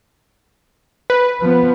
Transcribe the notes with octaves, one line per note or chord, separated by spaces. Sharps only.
B4
F3 B3